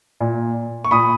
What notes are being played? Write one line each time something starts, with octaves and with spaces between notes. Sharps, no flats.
A#2
C#6
A#2 B5 D#6